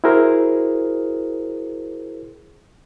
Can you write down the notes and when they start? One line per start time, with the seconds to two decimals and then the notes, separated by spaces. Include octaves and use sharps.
0.04 E4 F#4 G#4 A#4 C5